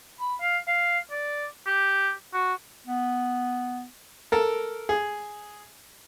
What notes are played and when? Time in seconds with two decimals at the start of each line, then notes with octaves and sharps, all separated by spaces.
0.20 B5
0.41 F5
0.67 F5
1.11 D5
1.66 G4
2.34 F#4
2.87 B3
4.32 A4 A#4
4.89 G#4